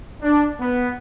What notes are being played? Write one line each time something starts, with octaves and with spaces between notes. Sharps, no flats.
D4
B3